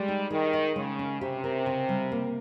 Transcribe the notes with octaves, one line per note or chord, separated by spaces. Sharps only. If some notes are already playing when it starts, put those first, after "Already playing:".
Already playing: G3 G#3
D#4
D#3 G#4
D#5
C#3 G#3
C#4
C3 G4
A#4
C#3
G3
A#3